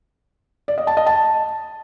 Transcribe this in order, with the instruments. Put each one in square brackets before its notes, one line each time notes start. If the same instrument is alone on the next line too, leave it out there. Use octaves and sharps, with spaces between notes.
[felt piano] D5
D#5
A5
D#5
A5